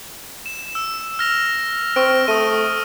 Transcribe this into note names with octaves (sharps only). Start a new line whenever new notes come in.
E7
E6
F6 A#6 F7
C4 C#6 F6 D7
A3 D#6 E6 D#7